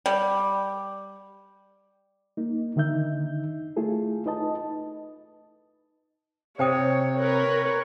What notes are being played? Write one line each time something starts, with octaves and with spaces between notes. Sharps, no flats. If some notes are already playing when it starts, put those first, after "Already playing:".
G3
A#3 D#4
D3 D#3 D#4 E5 G6
A3 E4 F4 G#4 A4
D#4 B4 D#5 A5
C3 C5 C#5 G5 D#6
A#4 B4 C#5